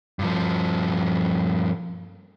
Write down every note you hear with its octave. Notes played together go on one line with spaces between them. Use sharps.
G2 F3